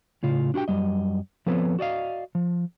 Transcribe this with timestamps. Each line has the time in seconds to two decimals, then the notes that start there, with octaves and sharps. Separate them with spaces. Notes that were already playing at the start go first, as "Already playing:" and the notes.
0.23 A2 C#3 F4
0.54 D4 F#4 G4 G5
0.68 F#2 G3 D#5
1.46 F3 B3 C4 A4 B4 C#5
1.79 F#4 D5 D#5 F5
2.35 F3